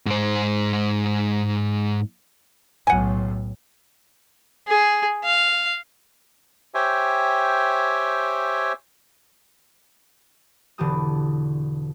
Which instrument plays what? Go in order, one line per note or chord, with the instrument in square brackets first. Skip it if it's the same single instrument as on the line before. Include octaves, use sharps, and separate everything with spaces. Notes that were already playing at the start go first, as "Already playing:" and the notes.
[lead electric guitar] G#2 C5
[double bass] B1 A2 [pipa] F#5 G#5
[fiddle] G#4
F5
[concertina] G4 C5 C#5 E5 G5 G#5
[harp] E1 D3 E3 G4 A5 D#6